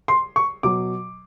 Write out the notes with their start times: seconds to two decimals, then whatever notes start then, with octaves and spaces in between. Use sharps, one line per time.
0.08 C6
0.36 C#6
0.63 B2 F#3 D6